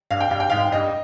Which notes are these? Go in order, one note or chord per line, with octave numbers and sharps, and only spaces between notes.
G2 F5
G5
G2 F5
G5
G#2 F5
G2 D#5